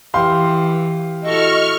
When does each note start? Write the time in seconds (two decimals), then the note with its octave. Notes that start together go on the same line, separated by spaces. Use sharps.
0.14 E3 G4 F5 C6
1.23 E4 F#4 A4 D#5 C#6 F6